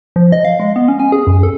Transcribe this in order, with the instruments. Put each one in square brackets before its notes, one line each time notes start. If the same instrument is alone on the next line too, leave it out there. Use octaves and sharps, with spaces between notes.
[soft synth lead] F3
D#5
F5
G#3
B3
C#4
G#5
G#4
F#2
A4